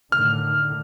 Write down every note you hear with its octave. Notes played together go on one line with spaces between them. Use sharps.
A2 D3 D#3 F6